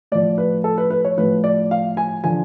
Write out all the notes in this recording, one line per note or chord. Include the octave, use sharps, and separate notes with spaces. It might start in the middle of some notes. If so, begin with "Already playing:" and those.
A2 F3 D5
B4
A4
B4
B4
C#5
A2 F3 B4
D5
F5
G#5
D3 F3 G#5